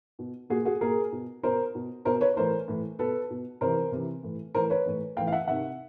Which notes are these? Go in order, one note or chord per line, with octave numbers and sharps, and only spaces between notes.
B2
A#2 F#4 G#4
F#4 G#4
A#2 G#4 A#4
B2
B2 A#4 C5
B2
B2 A#4 C5
B4 C#5
A2 E3 A#4 C5
A2 E3
B2 A4 B4
B2
C3 E3 A#4 C5
C3 E3
A2 E3
A2 E3 A#4 C5
B4 C#5
A2 E3
A2 E3 F5 G5
F5
E5 F#5
C3 D#3 E5 F#5